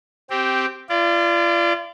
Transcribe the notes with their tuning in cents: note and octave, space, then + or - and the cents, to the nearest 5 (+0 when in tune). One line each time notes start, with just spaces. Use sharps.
C4 +0 G4 -10
F4 -35 D5 +0